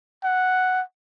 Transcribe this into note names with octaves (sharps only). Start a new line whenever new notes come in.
F#5